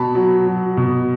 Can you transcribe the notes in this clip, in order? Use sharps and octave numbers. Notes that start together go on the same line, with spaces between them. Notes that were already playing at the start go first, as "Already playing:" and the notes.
Already playing: B2 A5 B5
F#3
F#3
B2